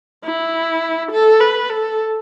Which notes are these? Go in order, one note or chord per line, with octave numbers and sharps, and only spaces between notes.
E4
A4
B4
A4